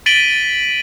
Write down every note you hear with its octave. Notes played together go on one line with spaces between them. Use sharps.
A6 B6 D7 D#7 F#7 G7